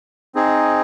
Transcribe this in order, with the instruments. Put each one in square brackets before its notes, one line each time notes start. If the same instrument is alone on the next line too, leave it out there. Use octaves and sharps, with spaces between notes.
[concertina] C4 D#4 G#4